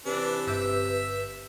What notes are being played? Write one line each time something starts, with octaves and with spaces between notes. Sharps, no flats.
C3 E3 D4 B4
G1 E5 E6 G6